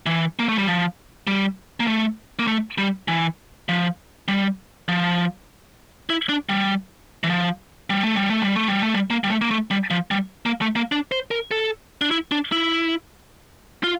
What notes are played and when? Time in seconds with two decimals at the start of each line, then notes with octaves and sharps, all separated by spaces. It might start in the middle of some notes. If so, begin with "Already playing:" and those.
0.06 E3
0.39 A#3
0.49 A3
0.58 G3
0.67 F3
1.27 G3
1.80 A#3
1.87 A3
2.39 A#3
2.47 A3
2.78 G3
3.08 E3
3.69 F3
4.28 G3
4.88 F3
6.10 E4
6.29 D4
6.49 G3
7.24 E3
7.29 F3
7.90 G3
8.03 A3
8.16 G3
8.29 A3
8.42 G3
8.56 A3
8.68 G3
8.81 A3
8.94 G3
9.10 A#3
9.24 G3
9.30 A3
9.41 A#3
9.51 A3
9.71 G3
9.91 F3
10.11 G3
10.46 A#3
10.62 A3
10.76 A#3
10.92 D4
11.12 C5
11.31 A#4
11.51 A4
12.01 D4
12.11 E4
12.32 D4
12.52 E4
13.84 F4